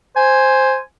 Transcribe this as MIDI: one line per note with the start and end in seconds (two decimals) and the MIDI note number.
0.16 0.79 72
0.16 0.77 80